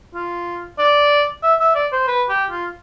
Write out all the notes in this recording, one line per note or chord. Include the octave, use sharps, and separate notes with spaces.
F4
D5
E5
E5
D5
C5
B4
G4
F4